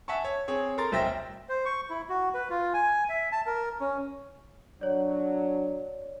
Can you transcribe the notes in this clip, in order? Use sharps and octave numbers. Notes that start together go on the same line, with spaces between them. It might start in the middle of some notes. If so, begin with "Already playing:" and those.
E5 F#5 G#5 A5 C#6
C#5
C4 G#4 C#5
A4 A#4 A#5 C6 A6
D1 B1 C5 E5 G5 A#6
C5
C#6
E4
F#4
B4
F4
G#5
E5
A5
A#4
C#4
F#3 D4 C#5 D5